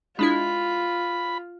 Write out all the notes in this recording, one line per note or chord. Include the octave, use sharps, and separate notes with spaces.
G#3 D4 E4 F4 B5